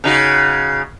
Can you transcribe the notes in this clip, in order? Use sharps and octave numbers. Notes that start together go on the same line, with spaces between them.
C#3 D#4 F#4